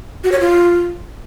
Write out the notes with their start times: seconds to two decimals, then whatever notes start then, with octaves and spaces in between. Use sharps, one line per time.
0.24 F#4
0.32 C#5
0.40 F4